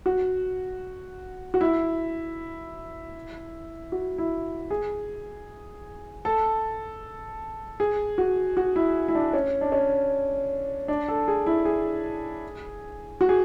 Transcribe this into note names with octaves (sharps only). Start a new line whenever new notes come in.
F#4
F#4
E4
F#4
E4
G#4
A4
G#4
F#4
F#4
E4
E4
D4
C#4
D4
C#4
D4
A4
G#4
E4
G#4
F#4
G#4